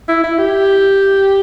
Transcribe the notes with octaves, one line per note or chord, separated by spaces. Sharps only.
E4
E4
G4